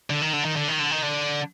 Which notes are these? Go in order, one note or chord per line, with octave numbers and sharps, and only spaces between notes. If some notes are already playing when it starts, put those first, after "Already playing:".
D3
D#3
D3
D#3
D3
D#3
D3
D#3
D3